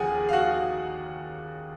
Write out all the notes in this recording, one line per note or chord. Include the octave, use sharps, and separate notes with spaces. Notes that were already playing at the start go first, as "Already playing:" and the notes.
Already playing: D#2 C#3 F3 G#4 F#5 G#5
F5
F#4 F#5